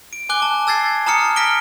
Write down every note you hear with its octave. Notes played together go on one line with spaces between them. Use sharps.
D7
G#5 D6 F#6 G7
A5
A5 E6 G#6 A6 C7
A5 A#5 D#6 F6 C#7
F6 A#6 B6 D7 G7